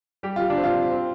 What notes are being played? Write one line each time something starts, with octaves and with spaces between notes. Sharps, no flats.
G3 G4
G3 F4
D4
C4
F4
C4
C4